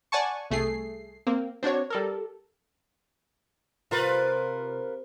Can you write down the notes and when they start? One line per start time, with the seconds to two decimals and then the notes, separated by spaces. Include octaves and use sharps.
0.12 D5 F#5 G#5 A5 C#6
0.50 C2 A3 G#4 C7
1.27 A#3 C4
1.63 C4 D4 F#4 C#5
1.90 G3 A4 A#4
3.91 C3 F4 A#4 B4